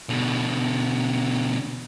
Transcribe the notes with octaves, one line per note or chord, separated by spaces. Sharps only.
B2 D3